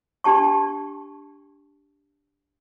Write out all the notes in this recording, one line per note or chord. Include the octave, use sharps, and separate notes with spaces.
D4 G4 A5 C#6